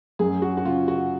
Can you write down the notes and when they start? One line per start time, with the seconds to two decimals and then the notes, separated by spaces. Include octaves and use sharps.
0.19 F#2 G#4
0.42 F#4
0.57 F#4
0.65 C#3 F4
0.88 F#4